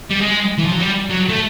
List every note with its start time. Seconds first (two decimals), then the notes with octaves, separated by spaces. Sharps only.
0.10 G3
0.21 G#3
0.58 E3
0.66 F3
0.73 F#3
0.81 G3
1.10 F#3
1.29 A3